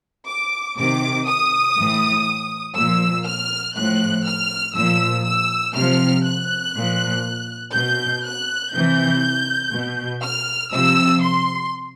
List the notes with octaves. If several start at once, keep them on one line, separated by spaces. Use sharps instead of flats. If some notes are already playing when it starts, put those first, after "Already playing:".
D6
C3 D#3 D6
D#6
A2 E3
A#2 F3 E6
F6
A2 F3 F#6
F6
A#2 F3 E6
E6
C3 F3 F6
F#6
A#2 F3
B2 G6
F#6
C3 E3 G6
B2
F6
C3 F3 E6
C6